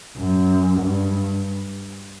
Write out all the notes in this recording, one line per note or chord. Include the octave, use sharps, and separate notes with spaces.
F#2
G2